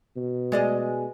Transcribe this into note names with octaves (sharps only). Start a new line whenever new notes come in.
B2
G#3 D5 D#5